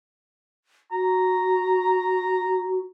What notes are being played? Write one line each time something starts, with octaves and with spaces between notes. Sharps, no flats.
F#4 A#5